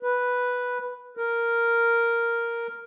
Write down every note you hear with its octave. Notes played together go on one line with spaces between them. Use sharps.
B4
A#4